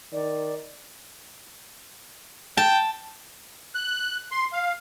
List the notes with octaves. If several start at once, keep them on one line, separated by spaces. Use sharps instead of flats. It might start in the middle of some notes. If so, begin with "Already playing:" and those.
D#3 D5
G5 A5
F#6
C6
F5